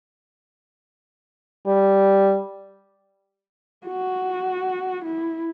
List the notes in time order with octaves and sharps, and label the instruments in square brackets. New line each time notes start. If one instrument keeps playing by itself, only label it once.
[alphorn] G3
[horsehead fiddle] F#4
E4